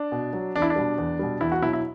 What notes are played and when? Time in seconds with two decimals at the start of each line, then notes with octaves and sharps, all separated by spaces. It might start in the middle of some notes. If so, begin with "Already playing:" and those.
Already playing: D4
0.12 B2
0.33 F#3
0.55 E2 D4
0.62 E4
0.70 D4
0.76 B2 G3
0.98 E2
1.19 B2 G3
1.41 E2 E4
1.52 F#4
1.62 B2 F#3 E4
1.73 E4